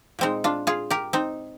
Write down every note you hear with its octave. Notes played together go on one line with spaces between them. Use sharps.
A#2 G#3 C4 D#4
D4 F4
F4 G#4
G4 A#4
C4 D#4